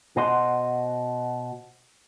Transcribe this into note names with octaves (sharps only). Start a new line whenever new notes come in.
B2 F#4 C5 D#5 F#5 C6